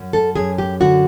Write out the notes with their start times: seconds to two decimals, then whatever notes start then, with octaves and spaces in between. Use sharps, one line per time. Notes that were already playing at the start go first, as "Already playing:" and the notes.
Already playing: F#2
0.13 A4
0.35 F#2 G#4
0.58 G4
0.80 D3 F#4